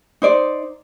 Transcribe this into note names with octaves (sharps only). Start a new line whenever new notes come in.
D#4 C5 D5